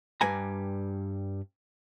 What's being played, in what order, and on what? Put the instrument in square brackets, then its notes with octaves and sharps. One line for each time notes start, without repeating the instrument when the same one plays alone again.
[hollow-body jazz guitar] G2 G3 B4 G#5 A#5